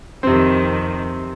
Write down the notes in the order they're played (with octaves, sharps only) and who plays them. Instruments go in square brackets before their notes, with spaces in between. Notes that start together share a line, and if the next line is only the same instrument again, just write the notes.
[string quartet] F2 D#3 [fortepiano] C3 C4